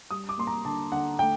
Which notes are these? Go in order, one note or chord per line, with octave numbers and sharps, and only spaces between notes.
G3 D#6
D6
A#3 C6
A#5
D3 A5
D3 F#5
A3 G5